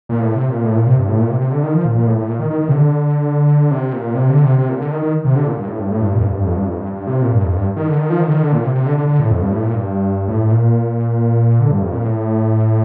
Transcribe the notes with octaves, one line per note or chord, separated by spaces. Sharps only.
A#2
A2
C3
A#2
A2
A#2
C3
G2
A2
A#2
C3
C3
D3
D#3
F3
A#2
A#2
A2
A2
A#2
D#3
D#3
D#3
C3
D3
C3
A#2
C3
D3
C3
C3
A#2
D3
D#3
D#3
C3
D3
A#2
G2
A2
G2
A2
G2
A#2
F2
G2
F2
G2
F2
G2
F2
G2
G2
C3
A#2
G2
F2
G2
D#3
D3
D#3
F3
D#3
D3
D#3
D3
A#2
C3
C3
D3
D3
D3
A2
F2
G2
A2
A#2
G2
A2
A#2
D3
G2
F2
A#2
A2